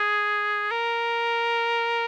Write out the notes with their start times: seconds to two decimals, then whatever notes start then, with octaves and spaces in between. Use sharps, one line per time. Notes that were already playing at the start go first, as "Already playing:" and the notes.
Already playing: G#4
0.71 A#4